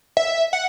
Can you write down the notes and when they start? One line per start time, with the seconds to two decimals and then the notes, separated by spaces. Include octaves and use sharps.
0.17 E5
0.53 F#5